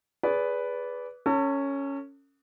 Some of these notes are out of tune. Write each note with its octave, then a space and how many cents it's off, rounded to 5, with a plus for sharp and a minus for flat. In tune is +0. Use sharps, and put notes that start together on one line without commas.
G#4 +0 B4 +0 D5 -25
C#4 +0 A4 +40